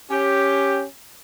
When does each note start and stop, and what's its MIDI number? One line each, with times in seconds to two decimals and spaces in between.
0.10 0.83 61
0.10 0.83 67